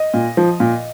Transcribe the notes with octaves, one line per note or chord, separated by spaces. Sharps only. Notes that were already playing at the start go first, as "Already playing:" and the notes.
Already playing: D#5
A#2
F3
A#2